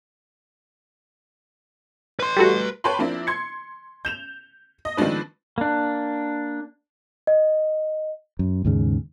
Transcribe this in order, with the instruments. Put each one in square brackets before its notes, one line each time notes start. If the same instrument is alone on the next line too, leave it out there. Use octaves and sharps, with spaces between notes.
[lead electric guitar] B4 C6
[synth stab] G3 A3 F#4
[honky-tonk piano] B4 C#5 G5 A5 B5 C6
F3 A#3 C4 D4 E4
C6 G#6 C#7
G6 E7 F7
D#5
D#3 F3 G#3 C4 D4 B4
[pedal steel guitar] A#3 D4
[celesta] D#5
[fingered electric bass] F#2
D#2 G#2 C#3